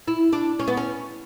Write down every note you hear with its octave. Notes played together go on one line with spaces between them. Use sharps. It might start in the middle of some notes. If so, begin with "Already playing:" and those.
E4
D4
C#4
B3
C#4